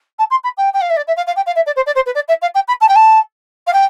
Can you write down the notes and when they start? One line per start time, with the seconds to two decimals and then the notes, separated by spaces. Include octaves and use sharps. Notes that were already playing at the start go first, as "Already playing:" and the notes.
0.19 A5
0.31 C6
0.44 B5
0.58 G5
0.74 G5
0.81 F5
0.90 E5
0.97 D5
1.07 E5
1.17 F5
1.27 F5
1.36 G5
1.47 F5
1.56 E5
1.66 D5
1.76 C5
1.86 D5
1.95 C5
2.06 B4
2.15 D5
2.28 E5
2.42 F5
2.55 G5
2.68 B5
2.81 A5
2.89 G5
2.96 A5
3.67 F5
3.73 G5